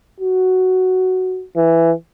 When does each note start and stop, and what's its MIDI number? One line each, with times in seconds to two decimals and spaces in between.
0.20 1.44 66
1.56 1.92 52